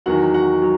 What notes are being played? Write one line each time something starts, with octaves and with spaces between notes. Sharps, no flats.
E2 D#3 F#3 F#4 F#5
F#4 F#5
F#3